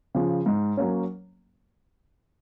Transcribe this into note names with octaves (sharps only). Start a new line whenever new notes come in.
C#3 F3
G#2
F#3 A#3 C#4